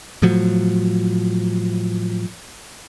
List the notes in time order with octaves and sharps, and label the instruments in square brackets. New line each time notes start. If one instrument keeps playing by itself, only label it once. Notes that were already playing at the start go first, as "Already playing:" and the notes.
[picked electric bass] A2 F3 F#3